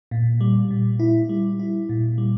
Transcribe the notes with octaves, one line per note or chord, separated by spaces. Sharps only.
A#2
G3
A#2
E4
G3
E4
A#2
G3